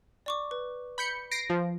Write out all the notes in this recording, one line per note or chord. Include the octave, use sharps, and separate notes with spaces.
D5 C#6 D6
B4
B5 G6 C#7
A#6 C7 D7
F3